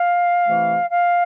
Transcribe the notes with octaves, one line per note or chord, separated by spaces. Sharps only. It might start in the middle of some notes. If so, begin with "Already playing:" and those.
Already playing: F5
C3 E3 A3 E4
F5